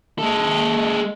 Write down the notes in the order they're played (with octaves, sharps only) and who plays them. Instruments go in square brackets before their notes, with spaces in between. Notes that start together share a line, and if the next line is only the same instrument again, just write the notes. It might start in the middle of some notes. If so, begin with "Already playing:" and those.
[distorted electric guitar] G#3 A4